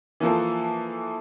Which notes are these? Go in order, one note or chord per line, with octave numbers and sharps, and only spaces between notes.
E3 F3 A#3 A4 A#4